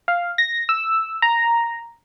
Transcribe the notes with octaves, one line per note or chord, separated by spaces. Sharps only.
F5
A#6
E6
A#5